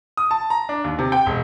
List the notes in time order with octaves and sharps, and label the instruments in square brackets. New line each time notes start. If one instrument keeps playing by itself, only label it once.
[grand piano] D#6
A5
A#5
D4
D#2
C3
G5
E1